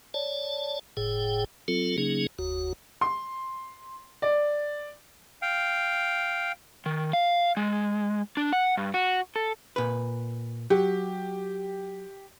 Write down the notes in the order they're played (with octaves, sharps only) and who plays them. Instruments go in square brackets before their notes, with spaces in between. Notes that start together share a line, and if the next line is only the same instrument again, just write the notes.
[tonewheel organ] C#5 D5 A5
F#1 A2 G#4 G5
F#3 C4 F4 A4
C#3 F#3 A#3 C#4 D#4 G#4
F#1 D#2 F#4
[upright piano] C6
D5
[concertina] F5 G5
[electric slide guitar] D#3
F5
G#3
D4
F#5
G2
F#4
A4
[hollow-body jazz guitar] A#2 B4
[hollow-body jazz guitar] F#3 [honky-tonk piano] G4